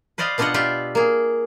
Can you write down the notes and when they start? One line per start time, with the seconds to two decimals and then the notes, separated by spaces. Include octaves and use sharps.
0.18 B4 C5 D5 D#5 F5
0.38 B2 B3 D4 F4 D#5 F#5
0.54 F4 G4 D5 E5 G5
0.95 A#3 G#4